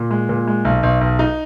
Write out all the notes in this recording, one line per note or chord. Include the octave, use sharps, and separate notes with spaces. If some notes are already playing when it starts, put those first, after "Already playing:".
Already playing: A#2
G#3
A#2
G#3
B1
B1
B1
D#4